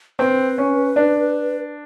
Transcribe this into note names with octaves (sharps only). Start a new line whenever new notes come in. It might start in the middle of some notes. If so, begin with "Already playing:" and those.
C4 B4
C#4
D4